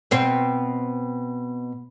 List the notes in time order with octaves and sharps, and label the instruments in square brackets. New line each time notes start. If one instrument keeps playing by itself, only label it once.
[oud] B2 C4